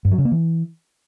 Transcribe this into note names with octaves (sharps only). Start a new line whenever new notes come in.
G2
F#3
C#3
A#3
E3